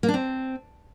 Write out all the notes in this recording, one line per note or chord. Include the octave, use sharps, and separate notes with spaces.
A#3
D4
C4